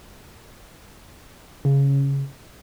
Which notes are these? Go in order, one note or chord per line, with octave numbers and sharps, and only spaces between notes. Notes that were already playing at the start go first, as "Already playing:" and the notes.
C#3